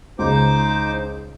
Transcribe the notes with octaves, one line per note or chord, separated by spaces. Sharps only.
C#2 D#4 C5 D6